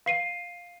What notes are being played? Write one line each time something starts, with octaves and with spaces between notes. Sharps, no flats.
F5 C7 D#7